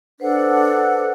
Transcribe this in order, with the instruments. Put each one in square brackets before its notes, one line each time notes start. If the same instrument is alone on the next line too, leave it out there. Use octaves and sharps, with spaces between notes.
[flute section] D4 A4 F#5 [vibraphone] B4 C5